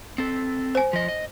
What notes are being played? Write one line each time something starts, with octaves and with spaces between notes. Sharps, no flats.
C4 A4
C5 G#5
F3 D#5
D#5